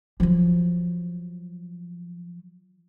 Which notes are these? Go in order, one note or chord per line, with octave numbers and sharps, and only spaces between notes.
F3 F#3